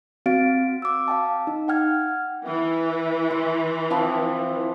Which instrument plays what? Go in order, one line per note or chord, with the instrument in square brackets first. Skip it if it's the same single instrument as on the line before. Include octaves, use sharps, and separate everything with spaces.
[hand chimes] C4 F#4 F5 A6 D7
D6 E6
F5 G5 A5
D#4
F#5 G5 F6 G#6
[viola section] E3
[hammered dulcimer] C6
F3 C4 E4